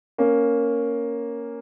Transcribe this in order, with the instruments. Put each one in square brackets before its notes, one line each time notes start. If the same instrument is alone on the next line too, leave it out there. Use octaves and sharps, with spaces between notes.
[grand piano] A#3 C#4